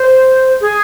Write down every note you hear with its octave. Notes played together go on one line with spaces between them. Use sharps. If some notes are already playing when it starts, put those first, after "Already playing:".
Already playing: C5
G#4